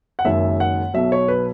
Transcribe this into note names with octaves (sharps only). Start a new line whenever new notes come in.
F#5
F#1 F#2 D#3 G#3 E5
F#5
B1 B2 F#3 E5
C#5
B4